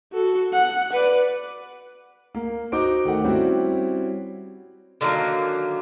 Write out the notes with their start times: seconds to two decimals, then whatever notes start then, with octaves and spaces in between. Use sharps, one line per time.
0.13 F#4 A4
0.53 F#5
0.93 B4 D5
2.35 A#3
2.72 D#4 F#4 C5 D6 D7
3.05 D#3 A3 F#5
3.24 G3 C4 C#4 E4 F#4
5.01 D3 D#3 F#3 A#3